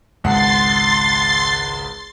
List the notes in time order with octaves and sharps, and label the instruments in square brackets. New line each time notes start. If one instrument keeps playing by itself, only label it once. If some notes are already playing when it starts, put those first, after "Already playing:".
[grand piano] G#1 C#2 F#5 [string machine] C6 A6 C7